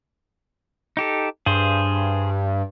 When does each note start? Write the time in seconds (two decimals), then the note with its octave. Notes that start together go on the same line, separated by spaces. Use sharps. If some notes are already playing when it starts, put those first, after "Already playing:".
0.97 D#4 G4 A4
1.46 G2 G#4 C5